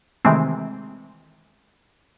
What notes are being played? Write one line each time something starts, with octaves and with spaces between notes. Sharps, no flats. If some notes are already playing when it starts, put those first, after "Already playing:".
C3 D#3 E3 G#3 A3 C4